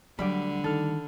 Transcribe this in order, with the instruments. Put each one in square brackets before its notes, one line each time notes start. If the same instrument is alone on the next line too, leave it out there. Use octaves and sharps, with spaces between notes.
[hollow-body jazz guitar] D2 G3 [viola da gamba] D3 [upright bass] F#3 [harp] B5 D6
[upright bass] D#3 [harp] A4 F6